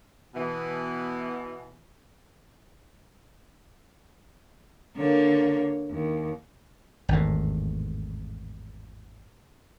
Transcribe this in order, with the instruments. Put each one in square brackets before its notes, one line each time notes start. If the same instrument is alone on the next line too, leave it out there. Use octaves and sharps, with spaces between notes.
[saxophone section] B2 E3
[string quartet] D3 A#3 C#5
D#2
[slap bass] G#1 E2 A2